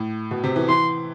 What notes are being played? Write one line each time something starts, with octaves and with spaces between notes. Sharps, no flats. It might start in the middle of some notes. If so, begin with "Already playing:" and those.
Already playing: A2
B2
C3
E3
E3 C6